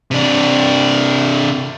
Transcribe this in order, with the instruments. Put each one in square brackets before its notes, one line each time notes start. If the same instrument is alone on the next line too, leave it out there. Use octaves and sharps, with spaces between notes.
[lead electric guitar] C3 D4